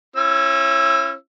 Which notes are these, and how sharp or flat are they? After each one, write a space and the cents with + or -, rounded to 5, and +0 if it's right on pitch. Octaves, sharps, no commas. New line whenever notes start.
C#4 -25 E4 +35 E6 +0